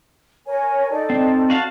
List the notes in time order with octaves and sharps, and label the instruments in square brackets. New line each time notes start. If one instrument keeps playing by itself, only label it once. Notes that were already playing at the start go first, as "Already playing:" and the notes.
[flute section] A#4 C#5 G#5
D#4 A4 D5
[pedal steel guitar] C4
F#4 F5 A5